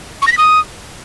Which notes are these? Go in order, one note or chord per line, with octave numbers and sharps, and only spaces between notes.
C#6
A#6
B6
D#6